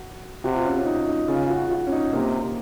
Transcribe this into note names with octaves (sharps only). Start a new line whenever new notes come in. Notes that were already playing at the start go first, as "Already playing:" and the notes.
Already playing: F#4
C3 F#4
F4
C#4
C#4
D#4
D#4
C#3 F4
F#4
F#4
C#4
D#4
C3 A#3